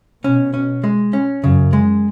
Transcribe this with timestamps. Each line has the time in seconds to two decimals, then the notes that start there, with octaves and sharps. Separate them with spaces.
0.24 B2 C#4
0.54 C#4
0.84 G#3
1.13 C#4
1.43 F#2 C#3
1.73 G#3